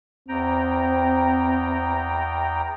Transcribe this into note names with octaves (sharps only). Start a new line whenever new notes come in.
E2 C4 G5 A#5